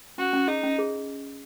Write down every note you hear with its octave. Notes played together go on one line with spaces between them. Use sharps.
C#4 F#4
C#4
D#4 G#4
C#4
G#4